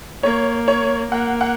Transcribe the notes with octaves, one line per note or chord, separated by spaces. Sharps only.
A#3 C#5
C#5
A#3 F#5
F#5